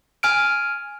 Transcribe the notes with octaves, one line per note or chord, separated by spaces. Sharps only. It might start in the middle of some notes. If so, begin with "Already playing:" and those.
G#5 F6 D7